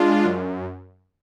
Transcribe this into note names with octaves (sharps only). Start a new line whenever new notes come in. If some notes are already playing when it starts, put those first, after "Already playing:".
Already playing: G#3 D4 F4
F#2